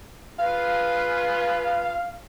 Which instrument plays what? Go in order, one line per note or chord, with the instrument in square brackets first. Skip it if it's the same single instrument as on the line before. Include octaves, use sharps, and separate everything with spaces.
[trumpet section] F4 G#4 B4 [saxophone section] F5